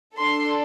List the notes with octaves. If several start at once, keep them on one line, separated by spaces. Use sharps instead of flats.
D4 A4 C6